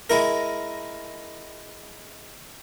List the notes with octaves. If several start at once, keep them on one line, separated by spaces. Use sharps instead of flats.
G#3 E4 A#4